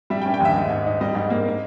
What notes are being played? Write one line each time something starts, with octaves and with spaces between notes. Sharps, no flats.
G3 E5
G5
C#4
G5
D#2 E5
G#2
G#2
D#4
G3 D#5
G#2
A#3
A#3